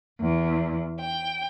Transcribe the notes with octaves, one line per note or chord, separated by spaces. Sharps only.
E2
G5